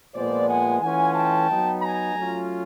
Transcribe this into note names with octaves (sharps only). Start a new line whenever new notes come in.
A#2 F3 G#3 B3 C5 D5
F#5 G#5
E3 A3 C#4 F4 F#5 G#5
G5 A5
F#3 B3 D#4
G#5 A#5
F#3 A3 C#4 F4